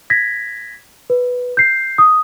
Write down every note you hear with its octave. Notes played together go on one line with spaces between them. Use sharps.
G#6 A#6 B6
B4
G6 C7
D#6